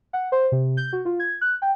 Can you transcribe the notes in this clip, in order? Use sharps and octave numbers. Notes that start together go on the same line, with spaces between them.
F#5
C5
C3
G6
F#4
F4
G#6
F#6
G5